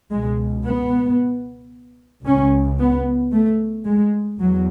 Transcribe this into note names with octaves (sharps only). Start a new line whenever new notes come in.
C#2 B2 G#3
B3
C#2 C#3 C#4
B3
A3
G#3
E2 F#3